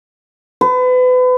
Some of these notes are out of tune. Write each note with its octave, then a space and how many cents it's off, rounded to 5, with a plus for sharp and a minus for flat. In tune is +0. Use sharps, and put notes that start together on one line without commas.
B4 +35